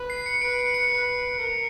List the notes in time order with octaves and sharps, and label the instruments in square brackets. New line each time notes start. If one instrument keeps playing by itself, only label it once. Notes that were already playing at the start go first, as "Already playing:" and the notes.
Already playing: [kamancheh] B4
[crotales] C7
C#7
[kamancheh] B4 [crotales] D7
[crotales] C#7
C#7
[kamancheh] B4
A#4